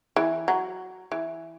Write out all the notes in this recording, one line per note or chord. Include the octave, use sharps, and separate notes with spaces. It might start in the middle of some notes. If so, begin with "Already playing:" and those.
E3
F#3
E3